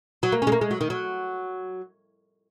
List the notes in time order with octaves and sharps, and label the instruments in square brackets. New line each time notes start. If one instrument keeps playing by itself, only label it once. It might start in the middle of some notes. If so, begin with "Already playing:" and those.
[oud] F#3
A#3
G#3 C#4
A#3
G#3
F#3
D#3
F#3